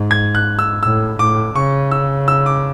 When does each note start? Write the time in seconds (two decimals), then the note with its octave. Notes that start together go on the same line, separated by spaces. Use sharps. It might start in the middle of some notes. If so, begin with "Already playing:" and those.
Already playing: G#2
0.11 G#6
0.35 F#6
0.59 E6
0.83 A2 E6
1.19 A2 D6
1.56 C#3 C#6
1.91 E6
2.28 E6
2.46 D6